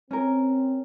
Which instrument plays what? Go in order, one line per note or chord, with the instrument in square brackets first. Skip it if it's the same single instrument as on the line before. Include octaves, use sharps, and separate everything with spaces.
[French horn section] C4 [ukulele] C#4 A#4